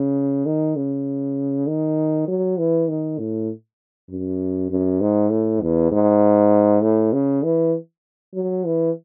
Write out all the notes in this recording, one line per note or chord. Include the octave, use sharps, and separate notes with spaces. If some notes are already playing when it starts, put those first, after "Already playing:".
Already playing: C#3
D#3
C#3
D#3
F#3
E3
D#3
A2
F#2
F#2
G#2
A2
E2
G#2
A2
C#3
E3
F#3
E3